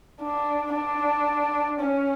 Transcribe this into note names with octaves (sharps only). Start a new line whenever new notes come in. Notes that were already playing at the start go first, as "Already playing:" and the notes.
D4
D4
C#4